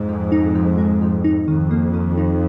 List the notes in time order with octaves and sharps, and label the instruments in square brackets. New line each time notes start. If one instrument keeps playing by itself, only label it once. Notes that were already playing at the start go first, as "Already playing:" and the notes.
Already playing: [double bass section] F2 G#2
[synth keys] F3
D#4
F3
G#3
F3
D#4
[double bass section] F2 [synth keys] D#3
[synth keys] A#3
D#3
D#4